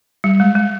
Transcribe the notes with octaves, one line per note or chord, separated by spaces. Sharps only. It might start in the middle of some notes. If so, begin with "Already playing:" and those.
G3
G#3
G#3